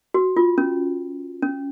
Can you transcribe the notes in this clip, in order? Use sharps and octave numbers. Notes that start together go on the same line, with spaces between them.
F#4
F4
C#4
C#4